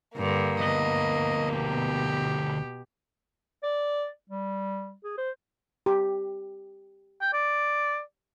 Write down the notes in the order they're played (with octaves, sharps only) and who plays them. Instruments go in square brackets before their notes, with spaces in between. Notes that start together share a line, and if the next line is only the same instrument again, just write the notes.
[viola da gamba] G2 D3 [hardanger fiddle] A#3
[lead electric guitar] D2 B3 [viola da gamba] D#5
[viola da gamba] B2 G4
[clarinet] D5
G3
G#4
C5
[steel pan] G4
[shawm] G5
D5